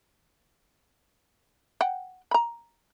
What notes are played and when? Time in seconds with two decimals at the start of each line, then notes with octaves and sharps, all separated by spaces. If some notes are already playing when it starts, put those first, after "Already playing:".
1.81 F#5 G5
2.31 A#5 B5